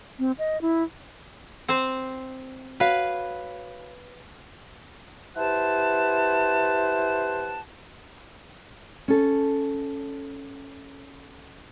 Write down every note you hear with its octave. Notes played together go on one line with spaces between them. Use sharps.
C4
D#5
E4
C4 C5
F#4 B4 C#5 F5
E4 G4 B4 C5 F#5 A5
C#4 A4